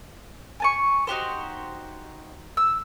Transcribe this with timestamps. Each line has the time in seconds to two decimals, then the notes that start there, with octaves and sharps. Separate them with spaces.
0.60 G#5 A5 C#6
1.07 D#4 F#4 G4 C5
2.57 E6